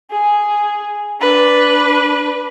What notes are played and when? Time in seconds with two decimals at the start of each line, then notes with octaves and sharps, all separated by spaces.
0.11 G#4
1.21 D4 B4